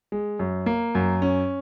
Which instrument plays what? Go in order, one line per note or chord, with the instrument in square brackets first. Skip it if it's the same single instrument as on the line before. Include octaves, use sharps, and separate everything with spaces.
[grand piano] G#3
F#2
A#3
F#2
C#4